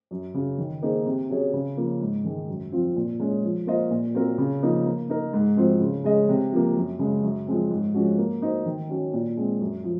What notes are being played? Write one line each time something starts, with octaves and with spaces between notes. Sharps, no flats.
F#2
C#3 F#3
D#3
A#3 D#4 G#4 C5
C3
F#3 C#4 G#4 C#5
C#3
F3 A#3 C#4
G#2
D#3 G#3
F#2
F3 C4 F4
A#2
G#3 C#4 G#4
F3
A#3 F4 C5 D#5
A#2
F#3 C4 F4 A#4
C#3
F3 A#3 D#4
A#3
D#4 A#4
G#2
F3 C4 F#4 C5
C#3
G#3 C#4 G#4 D#5
C3
F3 A#3
F#2
C#3 G#3
F#2
F3 G#3 C4
G#2
F3 G#3 C#4 F#4
A#3
D#4 F#4 C5
D#3
F#3 C#4 F#4
A#2
G#3 C4
F#2
F3